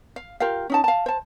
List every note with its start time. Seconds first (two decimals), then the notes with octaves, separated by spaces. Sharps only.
0.16 F5
0.40 F4 G4 A#4 F5
0.70 C#4 D#4 A5
0.84 F5 A5
1.06 C5 A5